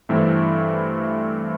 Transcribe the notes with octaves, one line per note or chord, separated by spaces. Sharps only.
G2 E3 A3 C4 E4